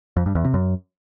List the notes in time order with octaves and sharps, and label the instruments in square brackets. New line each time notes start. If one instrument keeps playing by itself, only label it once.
[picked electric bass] F2
G2
E2
C3
F#2